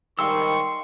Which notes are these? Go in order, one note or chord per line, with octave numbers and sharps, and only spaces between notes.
G#2 D#3 G3 F5 G5 C6 C#6 E6